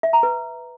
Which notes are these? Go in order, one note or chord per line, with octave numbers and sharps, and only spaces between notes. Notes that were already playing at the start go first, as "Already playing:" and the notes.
E5
A#5
B4